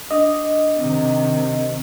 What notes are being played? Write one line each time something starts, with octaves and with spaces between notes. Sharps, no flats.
D4 D#5
C3 D#3